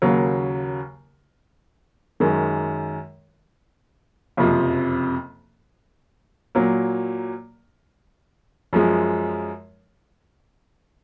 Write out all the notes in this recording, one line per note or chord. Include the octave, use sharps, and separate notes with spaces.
D#2 C#3 F#3 A#3
F#2 D#3 G#3
F#1 F2 C3 F3
A#2 F#3 A#3
F#2 F3 G#3